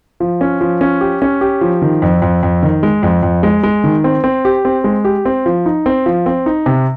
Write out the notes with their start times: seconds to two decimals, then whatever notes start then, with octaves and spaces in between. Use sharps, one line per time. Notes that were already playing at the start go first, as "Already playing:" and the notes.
0.20 F3
0.41 C#4
0.61 F3
0.81 C#4
1.01 G4
1.22 C#4
1.41 G4
1.61 F3
1.82 D#3
2.02 F2
2.22 F2
2.43 F2
2.63 D#3
2.83 G#3
3.03 F2
3.23 F2
3.43 G#3
3.63 G#3
3.84 D#3
4.04 C4
4.24 C4
4.45 G4
4.65 C4
4.84 G#3
5.05 G4
5.26 C4
5.46 F3
5.66 D#4
5.86 C4
6.06 F3
6.26 C4
6.46 D#4
6.66 C3